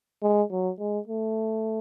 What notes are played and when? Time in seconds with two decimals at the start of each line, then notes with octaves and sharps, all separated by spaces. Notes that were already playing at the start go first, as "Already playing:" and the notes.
0.23 G#3
0.51 F#3
0.79 G#3
1.07 A3